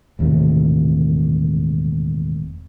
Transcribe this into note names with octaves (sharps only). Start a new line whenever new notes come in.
E1 D#2 A2 C3